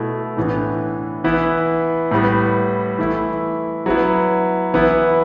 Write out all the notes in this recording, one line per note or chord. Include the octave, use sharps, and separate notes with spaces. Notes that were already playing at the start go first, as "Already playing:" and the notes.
Already playing: B2 A3 E4
A2 E3 B3 D4
E3 B3 E4
A2 G3 B3
E3 A3 E4
F#3 B3 E4
E3 B3 E4